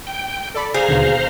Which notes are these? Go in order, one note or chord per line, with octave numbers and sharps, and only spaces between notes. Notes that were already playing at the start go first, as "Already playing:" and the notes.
G5
A4 D5 B5
G#4 C5 F5 A#5
D#2 B2 D3